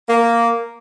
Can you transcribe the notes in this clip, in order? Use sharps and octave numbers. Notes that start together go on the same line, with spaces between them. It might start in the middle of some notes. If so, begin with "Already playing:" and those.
A#3